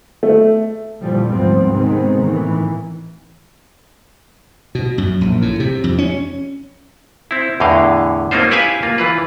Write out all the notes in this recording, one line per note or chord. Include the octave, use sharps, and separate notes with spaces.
A3
A#2 D3 E3 F3 G3
G#1 D2 F3 G3 B3 C4
C3 D#3 G#3 B3 C4
A2 D#3 E3
B2
F#2
A#1
A2
C3
F2
C#4
C4 E4
E2 A2 D3 E3 D#5 F5
A#3 C4 C#4 D#4 F4 C5
E4 G4 B4 E5 F5 G#5
A#3 F4
E3 F4 B4